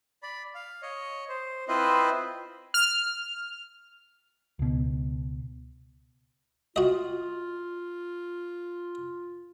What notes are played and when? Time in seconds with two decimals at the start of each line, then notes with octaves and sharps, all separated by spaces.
0.23 D5 B5
0.55 F5
0.82 C#5 D#5
1.29 C5
1.68 C4 E4 F4 B4 C5 D#5
2.74 F6
4.59 C#2 B2
6.76 F4 F#4 D#5